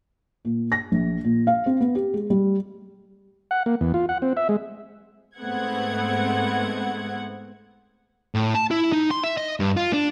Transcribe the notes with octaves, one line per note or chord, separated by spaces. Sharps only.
A#2
A#6
A#1
A#2
F5
C4
B3
G4
G#3
G3
F#5
A#3
E2
F4
F#5
C4
E5
G#3
G#2 A3 B3 C4 F#5 G#6
A2
A5
E4
D#4
C6
E5
D#5
G2
F4
D4